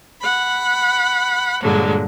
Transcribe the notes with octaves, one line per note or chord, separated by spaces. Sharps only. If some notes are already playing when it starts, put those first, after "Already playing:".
F#5 B5
G2 A#2 D3 F#3 G#3